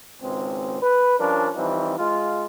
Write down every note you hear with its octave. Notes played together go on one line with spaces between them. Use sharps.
G#1 C#2 G#3 C4
B4
F3 G3 C#4 D4 A#4
E3 F3 G3 C4 D#4
G#3 F4